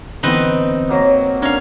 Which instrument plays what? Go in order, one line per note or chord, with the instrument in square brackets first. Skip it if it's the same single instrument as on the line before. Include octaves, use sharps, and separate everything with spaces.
[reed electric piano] D3 E3 B3 [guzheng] C4 D#4 B4
[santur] F#3 A#3
[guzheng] C#4 F5 [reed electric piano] D4 [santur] A#4